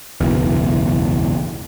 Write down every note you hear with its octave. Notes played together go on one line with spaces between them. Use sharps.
F#1 B1 E2